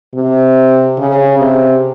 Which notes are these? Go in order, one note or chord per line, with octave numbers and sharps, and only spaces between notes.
C3
C#3
C3